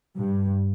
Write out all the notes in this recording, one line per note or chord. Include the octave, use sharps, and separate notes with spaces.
G2